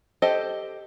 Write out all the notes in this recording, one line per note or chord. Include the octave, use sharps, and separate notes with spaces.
G4 A4 C5 D#5